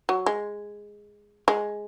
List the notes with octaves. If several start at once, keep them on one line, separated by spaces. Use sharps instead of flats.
F#3
G#3
G#3